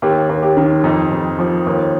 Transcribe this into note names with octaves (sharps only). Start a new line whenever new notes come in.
D#2 G4
D#2
G4
D#3
F2 D#4
F2
F3
D#2